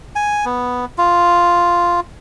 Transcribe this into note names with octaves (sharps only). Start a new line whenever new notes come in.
G#5
B3
F4